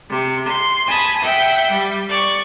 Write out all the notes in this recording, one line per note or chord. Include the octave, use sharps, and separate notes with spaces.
C3
C6
G#5 A5 B5 D#6
E5 F#5 G5
G3
D5 C#6